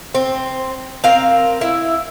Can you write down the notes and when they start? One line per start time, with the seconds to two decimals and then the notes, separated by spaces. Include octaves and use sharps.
0.15 C4
1.04 C4 A#4 F5
1.61 E4